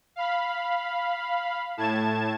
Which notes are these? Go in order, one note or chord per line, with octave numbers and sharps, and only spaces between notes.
F5 B5
A2 A5 G#6 E7